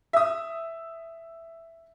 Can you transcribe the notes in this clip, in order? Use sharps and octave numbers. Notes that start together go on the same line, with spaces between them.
E5 D#6